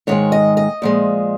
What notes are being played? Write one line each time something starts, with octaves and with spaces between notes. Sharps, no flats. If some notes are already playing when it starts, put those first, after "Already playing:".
G#2 D#3 G#3 C#5
D#5
D#5
A#2 F3 G#3